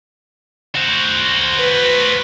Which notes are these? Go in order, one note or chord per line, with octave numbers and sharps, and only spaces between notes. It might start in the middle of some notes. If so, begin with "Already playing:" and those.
F#4 C5
B4